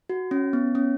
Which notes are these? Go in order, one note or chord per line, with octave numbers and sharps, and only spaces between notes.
F#4
C#4
B3
C#4